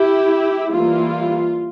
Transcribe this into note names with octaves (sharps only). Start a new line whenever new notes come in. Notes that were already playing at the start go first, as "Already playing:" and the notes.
Already playing: E4 G4
E3 G3 A#3 E4 F4